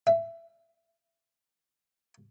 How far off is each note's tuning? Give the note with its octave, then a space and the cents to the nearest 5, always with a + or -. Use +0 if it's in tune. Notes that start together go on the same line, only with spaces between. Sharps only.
E5 +20